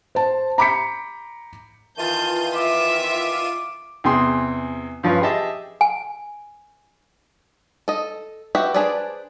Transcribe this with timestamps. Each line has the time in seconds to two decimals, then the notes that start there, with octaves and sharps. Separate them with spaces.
0.15 C5 A5
0.58 A#5 B5 D6 G6 B6 C#7
1.98 D#3 E3 F4 A5 G6 D#7
2.55 E5 D6
4.04 E2 C3 G#4 G5 C6 D#6
5.03 G2 F3 C#4 F4 B4
5.22 G4 G#4 D#5 E5 A5
5.81 G#5
7.88 A4 D#5
8.55 F#4 G4 B4 E5
8.74 D4 G#4 B4 C5 D5